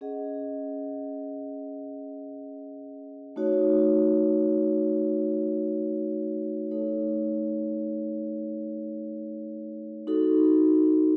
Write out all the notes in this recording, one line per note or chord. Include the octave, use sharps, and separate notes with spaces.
C#4 G#4 D#5 F#5
A3 D#4 F#4 C#5
A3 D#4 A4 C#5
D#4 F#4 A4